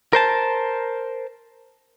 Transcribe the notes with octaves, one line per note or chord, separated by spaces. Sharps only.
A#4 C5 A5